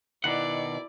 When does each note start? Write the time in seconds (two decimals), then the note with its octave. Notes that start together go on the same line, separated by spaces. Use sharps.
0.24 B2 D#3 E4 D5 F#5